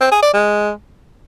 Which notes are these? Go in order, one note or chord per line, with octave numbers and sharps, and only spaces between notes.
C4
G#4
D5
G#3